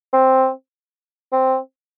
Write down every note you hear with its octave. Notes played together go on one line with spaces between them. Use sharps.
C4
C4